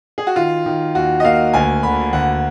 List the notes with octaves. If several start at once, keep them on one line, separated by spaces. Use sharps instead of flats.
G#4
F#4
D#3 F4
D#3
D#2 F#4
D#5
A#3 F5
D2 G#5
D3 B5
D2 F#5